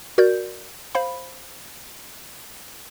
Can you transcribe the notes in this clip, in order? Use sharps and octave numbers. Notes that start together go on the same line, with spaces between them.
F#4 A#4 D5 G6
C5 F5 B5